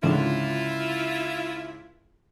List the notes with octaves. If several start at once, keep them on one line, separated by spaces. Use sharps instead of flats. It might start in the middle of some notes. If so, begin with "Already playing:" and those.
C#2 G#2 D3 E4 F4